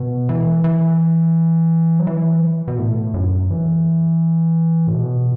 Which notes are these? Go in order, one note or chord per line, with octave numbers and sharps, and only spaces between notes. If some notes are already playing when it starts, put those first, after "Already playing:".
Already playing: B2
E3
E3
F#3
E3
B2
A2
F#2
E3
A2
B2